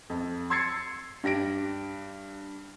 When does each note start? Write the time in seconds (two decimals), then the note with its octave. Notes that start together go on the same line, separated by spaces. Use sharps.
0.10 F2
0.50 C6 E6 G#6 A6 C7 C#7
1.24 G2 G4 A#6 D7